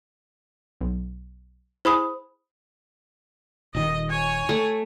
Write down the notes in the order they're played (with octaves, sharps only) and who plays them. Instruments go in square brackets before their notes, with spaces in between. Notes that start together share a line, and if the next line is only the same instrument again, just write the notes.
[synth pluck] B1
[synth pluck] E4 G#4 [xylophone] C5 B5 D#6
[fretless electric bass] D#1 D#3 [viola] D#5
[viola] C#5 G#5
[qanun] A3